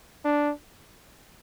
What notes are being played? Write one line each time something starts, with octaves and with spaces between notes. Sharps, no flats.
D4